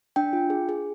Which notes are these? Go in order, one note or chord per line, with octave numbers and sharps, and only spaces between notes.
D4 G5
F4
G#4
G#4